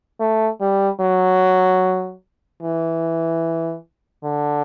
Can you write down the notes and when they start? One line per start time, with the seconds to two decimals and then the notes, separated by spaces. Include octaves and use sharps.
0.20 A3
0.61 G3
1.00 F#3
2.63 E3
4.24 D3